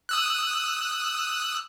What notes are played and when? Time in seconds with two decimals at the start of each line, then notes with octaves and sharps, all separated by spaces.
0.09 D#6 E6 F#6